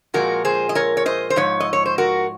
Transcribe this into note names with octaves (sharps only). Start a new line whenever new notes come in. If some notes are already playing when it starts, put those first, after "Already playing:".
A#2 F3 G#3 F#4 A#4
G#4 C5
D#5
A#4 C#5
C#5
C5 D#5
C5
G#2 F3 C#5
D#5
C#5
C5
F#4 A#4